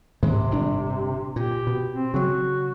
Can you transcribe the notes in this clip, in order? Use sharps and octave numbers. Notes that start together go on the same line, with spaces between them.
G#2 C3 D#3 G#3
G1 A2 D4
A#2 G4
B2
C4
C#3 F#3 F#4